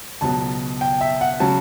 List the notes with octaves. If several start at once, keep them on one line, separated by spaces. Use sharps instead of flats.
C#2 B2 F#3 A5
G5
E5
F#5
C#3 F#3 A5